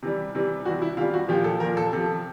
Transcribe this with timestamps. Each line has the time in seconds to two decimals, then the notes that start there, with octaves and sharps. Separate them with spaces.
0.03 C3 E3 G3
0.35 C3 E3 G3
0.65 C3 E3 G3 F#4
0.82 E4
0.97 C3 E3 G3 F4
1.14 F#4
1.29 A#2 F3 G4
1.44 A4
1.60 A#2 F3 A#4
1.77 A4
1.93 C3 F3 A4